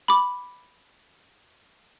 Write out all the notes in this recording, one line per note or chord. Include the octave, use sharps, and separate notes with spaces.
B5 D6